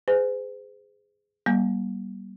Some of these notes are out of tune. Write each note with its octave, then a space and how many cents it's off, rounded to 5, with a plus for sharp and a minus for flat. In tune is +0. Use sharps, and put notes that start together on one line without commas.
G#4 +0 C5 -45 G#5 +0
G3 -15 A#3 +45 G#5 -15